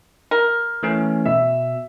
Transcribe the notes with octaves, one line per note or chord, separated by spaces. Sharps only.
A#4
E3 A3 C#4
B2 E5